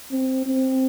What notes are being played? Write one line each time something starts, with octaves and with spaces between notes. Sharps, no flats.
C4
C4